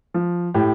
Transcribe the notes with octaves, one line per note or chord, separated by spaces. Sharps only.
F3
A2 G4